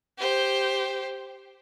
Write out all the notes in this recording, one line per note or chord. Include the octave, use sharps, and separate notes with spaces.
G4 C5